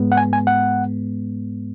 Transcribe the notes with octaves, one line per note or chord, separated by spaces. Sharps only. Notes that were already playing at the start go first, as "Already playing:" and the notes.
Already playing: G#2 G#3 B3
F#5
G#5
G#5
F#5